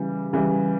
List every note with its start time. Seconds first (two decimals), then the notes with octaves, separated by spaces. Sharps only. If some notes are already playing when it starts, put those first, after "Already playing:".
Already playing: C#3 E3 G3
0.33 C#3 E3 G3